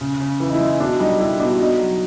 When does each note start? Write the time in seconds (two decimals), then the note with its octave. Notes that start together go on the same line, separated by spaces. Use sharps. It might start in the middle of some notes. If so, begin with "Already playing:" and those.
0.01 C#3
0.20 C#3
0.40 E3
0.49 D#4
0.54 E4
0.60 G#3
0.80 B2 D4
1.00 G3 D#4
1.19 G3 E4
1.40 B2 D4
1.59 B2 D#4
1.79 F#3